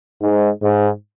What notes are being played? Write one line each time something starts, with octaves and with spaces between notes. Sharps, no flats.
G#2
G#2